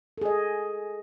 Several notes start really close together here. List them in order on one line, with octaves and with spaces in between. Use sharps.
A4 G#4 D#5